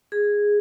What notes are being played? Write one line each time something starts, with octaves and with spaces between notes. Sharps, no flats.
G#4